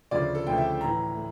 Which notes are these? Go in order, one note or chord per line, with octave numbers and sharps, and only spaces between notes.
D2 C#3 F3 A3 D5
A4
D2 C#3 F3 A3 G5
E5
A2 E3 A3 A#5
A3